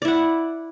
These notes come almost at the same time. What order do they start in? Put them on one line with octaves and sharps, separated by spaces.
D5 E4 F#5